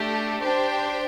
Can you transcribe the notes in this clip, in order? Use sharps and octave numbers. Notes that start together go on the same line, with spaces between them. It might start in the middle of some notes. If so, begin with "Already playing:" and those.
Already playing: A3 D4 G4
D4 G4 C5 G5